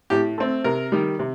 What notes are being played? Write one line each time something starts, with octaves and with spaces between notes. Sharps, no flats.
A2 G4
A3 C4
C3 A#4
D#3 G3
C3